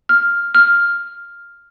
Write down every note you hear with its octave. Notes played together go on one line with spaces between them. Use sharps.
F6
F6